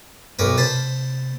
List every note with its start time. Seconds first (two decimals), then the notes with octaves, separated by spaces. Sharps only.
0.39 B1 G2 A#4 B4
0.58 C3 A#3 C5 A5 B5